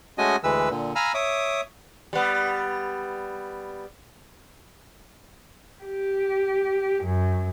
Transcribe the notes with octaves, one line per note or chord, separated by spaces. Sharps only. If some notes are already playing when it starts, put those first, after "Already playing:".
G#3 A3 C#4 F#4 D#5 G#5
D2 E3 G#3 B4 E6
A#2 D3
F5 G#5 A#5 B5 E6 F6
C#5 E5 D6 D#6
G3 B3
G4
F#2